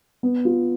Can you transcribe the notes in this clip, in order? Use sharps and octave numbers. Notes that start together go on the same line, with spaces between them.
B3
F4